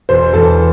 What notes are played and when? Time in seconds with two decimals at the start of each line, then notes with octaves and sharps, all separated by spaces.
0.09 E1 C5
0.33 E2 A4